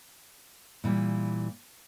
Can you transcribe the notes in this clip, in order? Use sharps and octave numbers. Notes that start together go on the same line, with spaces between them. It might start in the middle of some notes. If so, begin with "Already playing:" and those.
A#2 E3 G3